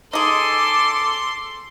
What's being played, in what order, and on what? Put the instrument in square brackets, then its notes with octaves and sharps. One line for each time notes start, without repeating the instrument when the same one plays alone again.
[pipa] D#4 G#4 [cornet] A4 [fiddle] C6 [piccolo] D6